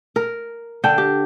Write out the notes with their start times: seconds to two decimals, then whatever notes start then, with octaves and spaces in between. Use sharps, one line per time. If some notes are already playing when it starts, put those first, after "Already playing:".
0.16 A#4
0.84 D3 D4 G5
0.98 G4